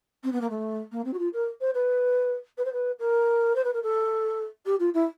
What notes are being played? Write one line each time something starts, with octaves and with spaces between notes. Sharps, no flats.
C4
B3
A#3
A3
A#3
C4
F#4
F4
A#4
C5
B4
B4
C5
B4
A#4
C5
B4
A#4
A4
G4
F4
E4